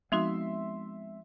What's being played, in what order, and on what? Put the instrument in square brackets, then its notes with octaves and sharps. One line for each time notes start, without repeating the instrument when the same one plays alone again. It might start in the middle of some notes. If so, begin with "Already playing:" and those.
[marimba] F3 D#4 F#4 [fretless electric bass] G#3 B3 C4 [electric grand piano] E5 C6